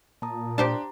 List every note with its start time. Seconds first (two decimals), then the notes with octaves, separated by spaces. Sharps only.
0.22 A#2 A5 A#5 D#6
0.58 D4 G4 C5 A5 A#5